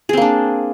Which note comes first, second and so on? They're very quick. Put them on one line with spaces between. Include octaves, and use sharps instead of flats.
G#4 C4 A#3 D4